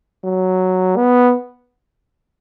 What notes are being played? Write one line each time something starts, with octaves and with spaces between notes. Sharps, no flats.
F#3
B3